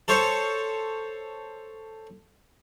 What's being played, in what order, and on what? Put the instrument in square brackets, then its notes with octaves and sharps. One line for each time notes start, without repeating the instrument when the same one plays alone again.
[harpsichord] A4 C5 C#5